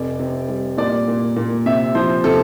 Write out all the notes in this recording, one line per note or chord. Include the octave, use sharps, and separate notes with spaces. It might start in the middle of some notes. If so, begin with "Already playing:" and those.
Already playing: F1 C3 D5
C3
G3
A#2 D5
A#2
A#2
C3 E5
F3 C5
C3 A4